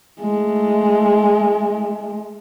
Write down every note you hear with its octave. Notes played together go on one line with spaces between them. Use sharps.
G#3 A3